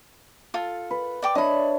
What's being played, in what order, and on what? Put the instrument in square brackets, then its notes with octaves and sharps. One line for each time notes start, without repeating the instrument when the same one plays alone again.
[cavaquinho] F4 A4
[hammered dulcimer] B4
[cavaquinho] D5 G5 D6
[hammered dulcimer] D4 C#5 E5 [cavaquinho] D#5 B5